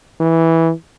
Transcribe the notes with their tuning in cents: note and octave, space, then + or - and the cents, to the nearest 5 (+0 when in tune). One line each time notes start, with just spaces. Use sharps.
E3 -10